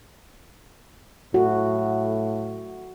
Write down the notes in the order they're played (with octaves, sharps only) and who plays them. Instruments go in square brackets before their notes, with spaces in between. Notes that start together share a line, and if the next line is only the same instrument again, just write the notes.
[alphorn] A2 [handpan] F#4